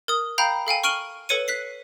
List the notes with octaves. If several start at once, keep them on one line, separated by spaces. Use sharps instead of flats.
A#4 D#6
F5 G5 A#5 B5 G6
A4 F5 G5 G#5
C#6 F6 D7 D#7 F#7 G7
A4 B4 C#5 C#7 D#7
F#6 B6 C7